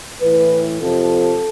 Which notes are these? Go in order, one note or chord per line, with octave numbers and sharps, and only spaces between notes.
A2 E3 B4
F2 C3 F3 A4